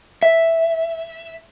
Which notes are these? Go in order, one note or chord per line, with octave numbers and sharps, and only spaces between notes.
E5